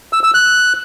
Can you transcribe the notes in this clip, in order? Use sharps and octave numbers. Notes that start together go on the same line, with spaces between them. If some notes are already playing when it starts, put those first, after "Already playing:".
E6
E6
F#6